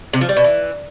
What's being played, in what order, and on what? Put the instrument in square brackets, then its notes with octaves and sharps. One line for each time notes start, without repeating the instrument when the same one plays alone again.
[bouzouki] C3
F3
G3
B2
E3